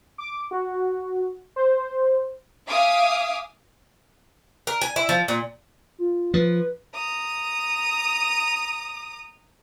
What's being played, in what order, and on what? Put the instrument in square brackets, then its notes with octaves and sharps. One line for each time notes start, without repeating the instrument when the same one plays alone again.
[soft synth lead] D6
F#4
C5
[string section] E5 F5 G#5 D6 D#6
[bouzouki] A#4
G#5
E4
F3
A#2
[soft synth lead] F4
[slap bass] F3 [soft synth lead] B4
[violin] A#5 D#6